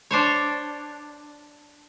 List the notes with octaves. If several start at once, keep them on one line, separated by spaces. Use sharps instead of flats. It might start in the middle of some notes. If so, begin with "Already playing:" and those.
D4 C5 C#5